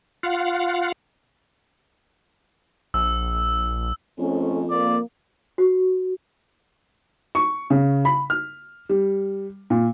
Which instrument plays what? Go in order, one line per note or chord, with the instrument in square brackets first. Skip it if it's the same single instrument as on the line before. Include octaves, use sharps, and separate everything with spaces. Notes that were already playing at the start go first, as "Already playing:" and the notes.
[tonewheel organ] F4 F5 F#5
[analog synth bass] A#1 [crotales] E6
[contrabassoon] F2 [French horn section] G#2 A3 C#4
[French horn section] A#3 [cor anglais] D5
[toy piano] F#4
[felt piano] C#6
C#3
B5
F6
G3
A#2